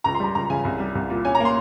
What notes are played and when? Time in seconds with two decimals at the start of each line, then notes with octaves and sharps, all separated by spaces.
0.04 C#2 A#5
0.15 C6
0.20 G3 A#5
0.35 C#2 A#5
0.50 C#3 G#5
0.65 C2
0.80 G3
0.95 C2
1.10 A#2
1.25 C#4 G#5
1.35 A#5
1.40 A#3 C6